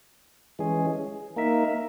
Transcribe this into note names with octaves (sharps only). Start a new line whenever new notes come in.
E3 G#3 C#4 G#4
A#3 D#4 A#4 E5